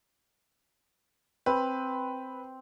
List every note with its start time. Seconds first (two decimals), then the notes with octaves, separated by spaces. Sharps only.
1.46 C4 B4